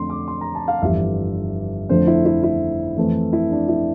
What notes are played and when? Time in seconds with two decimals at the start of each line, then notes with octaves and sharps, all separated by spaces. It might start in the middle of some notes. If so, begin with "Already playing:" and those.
Already playing: F2 D3 A3 C4 C6
0.10 D6
0.28 C6
0.41 A#5
0.55 A5
0.68 F5
0.82 G1 F2 E3 G3 E5
1.89 F2 D3 F3 A3 C5
2.07 E4
2.25 E4
2.43 E4
2.97 F2 E3 A3 C4
3.33 E4
3.51 D4
3.68 E4